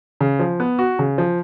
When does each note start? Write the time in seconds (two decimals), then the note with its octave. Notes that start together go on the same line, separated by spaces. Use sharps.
0.21 C#3
0.39 F3
0.60 B3
0.79 F#4
0.99 C#3
1.18 F3